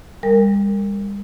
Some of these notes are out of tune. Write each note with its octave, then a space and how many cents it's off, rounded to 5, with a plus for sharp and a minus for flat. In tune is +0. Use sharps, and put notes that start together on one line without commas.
G3 +40 A#4 -20